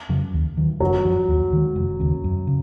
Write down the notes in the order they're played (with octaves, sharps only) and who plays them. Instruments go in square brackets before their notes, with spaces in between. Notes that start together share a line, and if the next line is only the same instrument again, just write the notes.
[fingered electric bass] F2 C#3 F#3
D#2
D#3 F#3
[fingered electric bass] F#1 [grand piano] F#3
[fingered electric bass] F#2 F3
D#2
D#3 G#3
F1
D#2 C#3
F#2
C#3